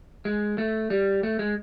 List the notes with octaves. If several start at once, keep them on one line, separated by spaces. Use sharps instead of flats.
G#3
A3
G3
A3
G#3